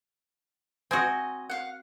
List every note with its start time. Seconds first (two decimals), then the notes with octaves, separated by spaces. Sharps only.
0.91 C4 F#4 D#5 G#5
1.49 F5 F#5